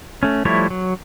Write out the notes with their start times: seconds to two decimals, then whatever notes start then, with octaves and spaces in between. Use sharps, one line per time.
0.23 A3 C#4
0.45 F3 G3 A3 E4 C#5
0.70 F#3